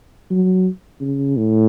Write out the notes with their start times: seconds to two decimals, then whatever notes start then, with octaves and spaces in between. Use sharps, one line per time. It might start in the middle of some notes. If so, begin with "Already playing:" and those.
0.30 F#3
1.01 C#3
1.37 A2